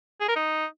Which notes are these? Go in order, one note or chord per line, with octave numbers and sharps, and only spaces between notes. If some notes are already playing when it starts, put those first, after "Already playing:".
G#4
A#4
D#4